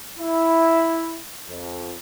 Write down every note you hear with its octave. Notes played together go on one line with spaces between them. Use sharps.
E4
F2